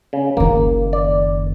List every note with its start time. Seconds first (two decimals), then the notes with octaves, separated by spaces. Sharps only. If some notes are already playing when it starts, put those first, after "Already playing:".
0.13 C#3
0.37 F#1 D#3 A#3
0.93 D5